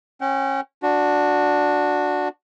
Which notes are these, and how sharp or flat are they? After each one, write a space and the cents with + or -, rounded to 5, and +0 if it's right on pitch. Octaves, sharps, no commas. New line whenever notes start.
C#4 -25 G5 -45
D4 +0 F#4 -15